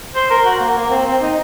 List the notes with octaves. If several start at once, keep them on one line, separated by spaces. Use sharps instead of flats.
C5
A#4
F#4
A#3
A#3
C4
C4
D#4